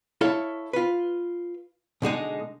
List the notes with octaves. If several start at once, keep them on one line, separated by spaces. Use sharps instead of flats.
E4 A4 C#5 F5
F4 B4
B2 D3 G#3 D#4